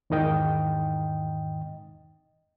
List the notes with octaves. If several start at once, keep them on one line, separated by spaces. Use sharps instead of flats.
E2 G#2 D#3 D#5 G5